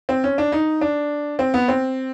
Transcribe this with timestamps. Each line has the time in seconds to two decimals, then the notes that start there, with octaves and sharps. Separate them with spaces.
0.09 C4
0.24 C#4
0.38 D4
0.52 D#4
0.81 D4
1.39 C4
1.54 B3
1.68 C4